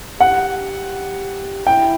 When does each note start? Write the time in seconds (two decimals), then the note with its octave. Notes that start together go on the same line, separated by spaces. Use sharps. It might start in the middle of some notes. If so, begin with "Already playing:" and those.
0.20 G4 F#5
1.66 E4 G5